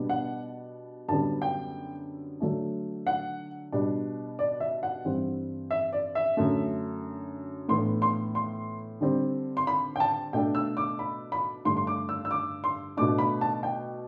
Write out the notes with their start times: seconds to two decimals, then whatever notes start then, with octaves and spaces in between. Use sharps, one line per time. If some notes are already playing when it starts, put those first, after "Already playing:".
Already playing: B2 G3 B3 D4
0.09 F#5
1.08 F#2 D3 G3 B3 A5
1.42 G5
2.40 D3 F#3 A3 D4
3.07 F#5
3.72 B2 G3 D4
4.39 D5
4.60 E5
4.83 F#5
5.05 G2 E3 G3 C4
5.71 E5
5.93 D5
6.15 E5
6.37 F#2 D3 A3
7.68 A2 E3 B3 D4 C6
8.02 C6
8.35 C6
9.01 D3 G3 C4
9.57 C6
9.67 B5
9.96 G5
10.00 A5
10.33 B2 A3 D4 G5
10.55 E6
10.77 D6
10.99 B5
11.32 B5
11.65 G2 D3 A3 D4 C6
11.77 C6
11.87 D6
12.09 E6
12.25 E6
12.31 D6
12.64 C6
12.97 B2 A3 D4 D6
13.18 B5
13.41 A5
13.63 G5